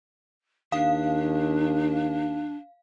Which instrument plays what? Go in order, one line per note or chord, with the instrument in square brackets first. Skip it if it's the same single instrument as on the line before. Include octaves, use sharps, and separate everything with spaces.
[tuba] D#2 [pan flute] D4 [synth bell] F5